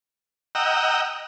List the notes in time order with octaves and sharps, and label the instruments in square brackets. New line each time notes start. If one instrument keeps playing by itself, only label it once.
[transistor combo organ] D#5 F#5 G5 A#5 E6